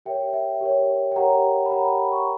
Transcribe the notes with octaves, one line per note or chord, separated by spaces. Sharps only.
G4 A#4 C#5 E5 G5
E5 G5
G4 A#4 C#5
G5
G4 A#4 C#5 F#5 A#5
B5
G4 A#4 C#5 F#5 A#5
G5 B5
G5 B5
A#5 C#6